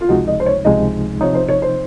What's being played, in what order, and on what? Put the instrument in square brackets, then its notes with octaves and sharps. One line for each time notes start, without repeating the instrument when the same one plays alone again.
[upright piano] F4
[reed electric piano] C#2 C3 F3 G#3 D#4 [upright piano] F#4
[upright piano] D#5
C5
C#5
[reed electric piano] C#2 C3 F3 G#3 D#4 [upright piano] D#5
[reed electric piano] C3 F3 C4 D#4 [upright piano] C#5
[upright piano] C5
C#5
C5